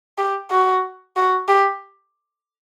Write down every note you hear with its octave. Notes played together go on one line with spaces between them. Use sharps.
G4
F#4
F#4
G4